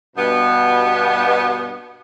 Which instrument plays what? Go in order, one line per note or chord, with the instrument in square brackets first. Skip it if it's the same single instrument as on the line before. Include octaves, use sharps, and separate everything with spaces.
[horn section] G2 B2 B3